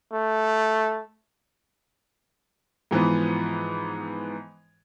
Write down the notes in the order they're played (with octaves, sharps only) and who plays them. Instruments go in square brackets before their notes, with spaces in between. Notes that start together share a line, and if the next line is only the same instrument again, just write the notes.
[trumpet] A3
[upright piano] G#2 E3 F3 B3